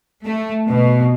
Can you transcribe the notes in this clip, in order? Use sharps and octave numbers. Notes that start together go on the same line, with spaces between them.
A3
B2